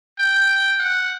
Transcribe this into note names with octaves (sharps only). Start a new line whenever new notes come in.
G5
F#5